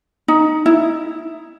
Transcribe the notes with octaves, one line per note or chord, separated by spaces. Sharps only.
D#4
E4